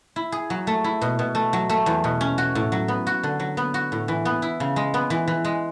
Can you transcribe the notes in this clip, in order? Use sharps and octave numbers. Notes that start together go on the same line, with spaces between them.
E4
G#4
F#3
A3
E4
B2
B2
A3
F#3
A3
E2
B2
C#4
F#4
A2
F#3
B3
F#4
D3
F#3
B3
F#4
A2
E3
B3
E4
C#3
G#3
B3
E3
E3
G#3